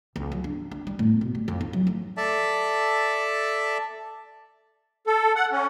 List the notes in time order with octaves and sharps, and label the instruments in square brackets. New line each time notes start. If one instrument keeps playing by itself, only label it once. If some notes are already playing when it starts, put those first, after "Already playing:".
[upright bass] C#2
F#3
D4
D4
G3
A2
B2
G3
F2
D#4
F#3
A3
[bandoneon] A4 D5 E5 A5
[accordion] A4
F#5
C#4